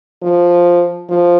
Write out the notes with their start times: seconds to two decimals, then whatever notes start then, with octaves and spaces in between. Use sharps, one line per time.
0.23 F3
1.09 F3